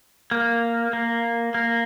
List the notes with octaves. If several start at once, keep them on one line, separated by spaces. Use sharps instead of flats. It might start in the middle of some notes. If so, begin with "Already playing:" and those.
A#3
A#3
A#3